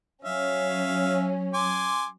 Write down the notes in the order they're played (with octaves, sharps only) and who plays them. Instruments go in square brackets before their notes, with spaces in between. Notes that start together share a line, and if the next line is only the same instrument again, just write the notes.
[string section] F#3 C#4 [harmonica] E5 F5
[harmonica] G#5 C6 D6